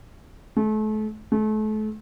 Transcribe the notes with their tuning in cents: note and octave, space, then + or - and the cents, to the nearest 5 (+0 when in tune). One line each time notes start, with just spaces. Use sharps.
A3 -35
A3 -35